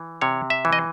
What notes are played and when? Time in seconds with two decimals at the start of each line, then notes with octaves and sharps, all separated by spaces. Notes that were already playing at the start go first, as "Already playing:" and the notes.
Already playing: E3
0.21 C3 C#5
0.50 E5
0.65 E3
0.73 D#5